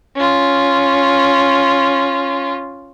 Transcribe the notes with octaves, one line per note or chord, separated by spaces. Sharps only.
C#4 F4